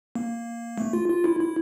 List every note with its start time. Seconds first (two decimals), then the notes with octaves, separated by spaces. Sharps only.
0.15 A#3
0.78 A3
0.93 F4
1.09 F4
1.24 E4
1.40 E4